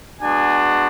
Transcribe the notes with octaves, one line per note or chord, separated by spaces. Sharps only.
G#3 B3 D4 F#4 G#5